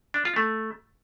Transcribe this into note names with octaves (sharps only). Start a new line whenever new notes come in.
D4
F4
A3